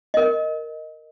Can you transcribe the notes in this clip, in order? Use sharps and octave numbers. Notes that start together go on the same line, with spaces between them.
A#4 D#5